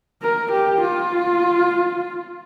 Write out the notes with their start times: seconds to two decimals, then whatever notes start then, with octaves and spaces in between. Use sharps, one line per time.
0.22 A#4
0.52 G4
0.80 F4